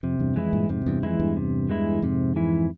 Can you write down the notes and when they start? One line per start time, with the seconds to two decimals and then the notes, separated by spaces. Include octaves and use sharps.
0.03 F2 C3
0.19 E2 G2
0.36 F2 E3 G#3 E4
0.53 G2 A#2
0.69 F2 G#2 C3
0.82 F2
0.86 E2 G2
1.03 F2 E3 G#3 E4
1.19 E2 G2
1.36 C3
1.69 E3 G#3 E4
2.02 F2 G#2 C3
2.36 E3 G#3 E4